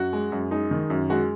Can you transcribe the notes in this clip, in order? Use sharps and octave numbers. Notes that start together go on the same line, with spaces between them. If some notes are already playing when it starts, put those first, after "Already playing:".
Already playing: F#2 F#4
G#3
F#2
G#3 D#4
D#3
F#2
G#3 F#4